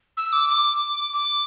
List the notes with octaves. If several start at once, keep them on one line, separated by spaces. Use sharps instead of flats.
E6
D6
D6
D6